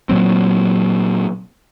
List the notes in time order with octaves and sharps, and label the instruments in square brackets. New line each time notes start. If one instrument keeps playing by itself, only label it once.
[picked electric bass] A#2 F#3 C4